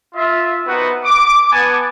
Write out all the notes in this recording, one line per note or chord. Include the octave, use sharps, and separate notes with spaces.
F4 E5
B3 C4 D#4 F#4 A#4 B4
D6
B3 G#5 A5